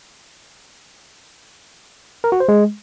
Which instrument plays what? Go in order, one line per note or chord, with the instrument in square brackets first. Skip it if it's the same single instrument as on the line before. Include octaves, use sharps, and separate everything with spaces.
[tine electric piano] A#4
F#4
C5
G#3